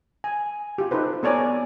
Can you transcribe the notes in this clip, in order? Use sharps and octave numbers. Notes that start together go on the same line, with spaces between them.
G#5
F4 G4
D#4 A4 B4 C5
B3 A4 C#5 D5 G#5 A#5